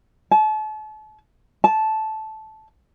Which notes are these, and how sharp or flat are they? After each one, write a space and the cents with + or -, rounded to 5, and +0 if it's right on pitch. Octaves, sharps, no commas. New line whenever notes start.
A5 -35
A5 -10